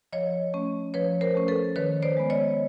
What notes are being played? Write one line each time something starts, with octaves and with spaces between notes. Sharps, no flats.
F3 C#5 D#5
A3 C#4
F3 B4 C#5
A#4 C5
A3 C#4
A4 B4
D#3 B4 C#5
C5 D5
G#3 B3
C#5 D#5